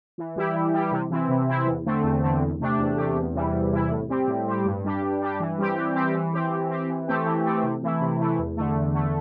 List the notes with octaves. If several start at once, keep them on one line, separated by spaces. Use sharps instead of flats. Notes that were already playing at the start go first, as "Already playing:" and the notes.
E3
G3 E4 G4
E3
G3 E4 G4
C3
E3 C4 E4
C3
E3 C4 E4
E2
D3 A3 C4
E2
D3 A3 C4
E2
C3 A3 D4 G4
E2
C3 A3 D4 G4
E2
C3 E3 G3 E4
E2
C3 E3 G3 E4
A2
G3 C4 G4
A2
G3 C4 G4
G2
G3 D4 G4
G2
G3 D4 G4
E3
G3 C4 G4
E3
G3 C4 G4
E3
C4 G4
E3
C4 G4
E3
A3 C4 G4
E3
A3 C4 G4
C3
E3 A3 E4
C3
E3 A3 E4
E2
D3 A3
E2
D3 A3